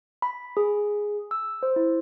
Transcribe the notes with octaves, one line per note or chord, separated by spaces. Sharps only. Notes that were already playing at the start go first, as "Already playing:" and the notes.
B5
G#4
E6
C5
E4